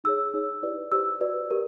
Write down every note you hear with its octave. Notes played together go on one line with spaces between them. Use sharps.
D#4 G#4 C#5 E6
D#4 G#4 C#5
E4 G4 B4 D5
G4 C5 E6
F#4 B4 D5
G4 A#4 D5